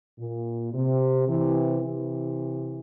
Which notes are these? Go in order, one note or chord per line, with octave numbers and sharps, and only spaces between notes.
A#2
C3
C3 E3
C3 E3